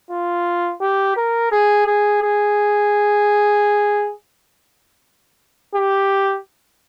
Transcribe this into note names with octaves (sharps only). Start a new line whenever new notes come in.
F4
G4
A#4
G#4
G#4
G#4
G4